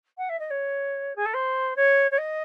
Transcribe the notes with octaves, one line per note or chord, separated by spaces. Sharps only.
F#5
E5
D#5
C#5
G#4
A4
C5
C#5
C#5
D#5